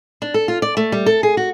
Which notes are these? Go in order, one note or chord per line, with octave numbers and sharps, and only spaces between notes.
D4
A4
F4
D5
A3
G3
A4
G#4
F#4